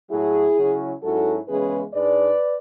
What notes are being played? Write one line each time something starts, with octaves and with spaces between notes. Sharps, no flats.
A2 F#3 A3 E4 G#4
C#3 F#3 C#4 E4
G#2 F#3 C#4 E4 F#4 A4
E2 C#3 E3 G#3 C#4 G#4 B4
G#2 G#3 D4 B4 D5